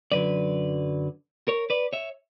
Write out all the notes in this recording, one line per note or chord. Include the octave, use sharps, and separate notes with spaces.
F#2 D3 F#3 B4 D5
A#4 C#5
B4 D5
C#5 E5